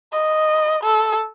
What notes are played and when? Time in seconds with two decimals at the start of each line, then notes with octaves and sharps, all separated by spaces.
0.12 D#5
0.83 A4